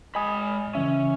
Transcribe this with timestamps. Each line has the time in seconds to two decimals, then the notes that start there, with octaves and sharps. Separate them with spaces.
0.15 G#3 D#5 G#5 B5 D#6
0.75 C#3 E3 C#4 E5